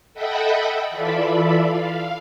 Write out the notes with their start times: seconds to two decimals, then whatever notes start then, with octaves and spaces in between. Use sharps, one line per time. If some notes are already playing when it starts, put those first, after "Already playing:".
0.14 A4 D#5 E5 F#5 G5 B5
0.91 E3 F4 A4 D5 E5 B5
1.63 F5